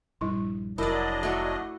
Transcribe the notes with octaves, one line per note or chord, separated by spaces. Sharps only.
A#1 G2 G3 E4 C6
F1 F#3 D4 E4 A#4 D5 D#5
A3 F#4